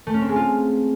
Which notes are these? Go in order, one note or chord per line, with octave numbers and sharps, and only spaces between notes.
A3
C#4
C4
G#3
F4